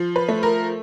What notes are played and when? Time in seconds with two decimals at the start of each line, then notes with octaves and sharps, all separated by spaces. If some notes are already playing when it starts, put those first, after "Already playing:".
Already playing: F3
0.16 B4
0.28 A3
0.43 A#4